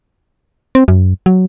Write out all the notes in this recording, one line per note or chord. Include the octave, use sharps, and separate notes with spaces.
C4
F#2
F#3